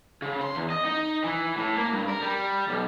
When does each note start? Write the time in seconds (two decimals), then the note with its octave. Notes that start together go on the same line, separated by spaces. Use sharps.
0.22 C#3
0.41 C6
0.55 E2
0.70 D#5
0.85 D#4
1.24 E3
1.58 A2
1.77 A#3
1.93 G2
2.09 A#4
2.22 G3
2.68 B1